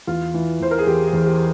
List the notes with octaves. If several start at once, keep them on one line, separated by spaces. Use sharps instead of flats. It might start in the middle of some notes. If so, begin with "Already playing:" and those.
E2 F4
E3
E2 C5
A#4
G#4
E2 G4
G#4
E2
G4